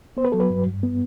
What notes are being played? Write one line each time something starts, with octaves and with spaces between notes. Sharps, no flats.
B3 C5
B4
F#3 A4
B4
G2
G2
B3